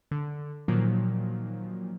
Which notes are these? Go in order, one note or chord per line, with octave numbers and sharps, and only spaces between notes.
D3
A#2 D#3 F3 F#3 A#3